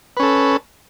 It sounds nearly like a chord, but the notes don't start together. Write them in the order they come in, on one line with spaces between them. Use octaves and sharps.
B4 C#4 A4